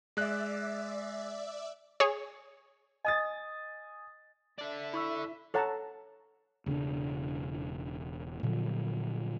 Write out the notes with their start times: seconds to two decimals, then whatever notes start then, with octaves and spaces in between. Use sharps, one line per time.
0.17 G#3 D5 E5 F#6
2.00 G#4 C#5
3.05 D#5 G#5 D#6 A6
4.59 A4 D5 E5
4.94 E4 B5 C#6 E6
5.54 A4 C#5 F#5 A5 A#5
6.66 E1 C#3 C4 D4
8.43 A#2 D3 F3 F#3